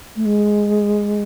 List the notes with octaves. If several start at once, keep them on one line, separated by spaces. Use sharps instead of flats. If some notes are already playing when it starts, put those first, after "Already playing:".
A3
G#3